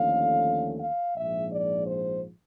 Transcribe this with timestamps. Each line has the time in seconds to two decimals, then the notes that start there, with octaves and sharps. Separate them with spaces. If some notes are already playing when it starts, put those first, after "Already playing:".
Already playing: D#2 D3 F3 A3 C#4 F5
0.80 F5
1.15 A#1 G#2 F3 E5
1.51 D5
1.87 C5